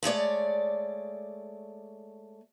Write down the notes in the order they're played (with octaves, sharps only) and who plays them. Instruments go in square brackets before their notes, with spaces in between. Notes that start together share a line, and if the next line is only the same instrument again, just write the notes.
[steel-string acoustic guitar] G#3 A3 C#5 D5